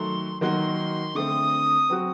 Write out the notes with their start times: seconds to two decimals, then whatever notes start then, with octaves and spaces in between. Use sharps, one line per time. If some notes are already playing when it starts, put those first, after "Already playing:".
Already playing: D#3 F#3 A3 C6
0.41 D#3 F#3 A#3 D#4 F#4 C6
1.15 D3 A3 C4 D#6
1.90 F#3 C4 F#4